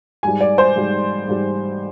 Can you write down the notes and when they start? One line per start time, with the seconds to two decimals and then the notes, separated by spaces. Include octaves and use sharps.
0.23 G#2 G3 G#5
0.41 D5
0.58 C5
0.76 G#2 G3
1.27 G#2 G3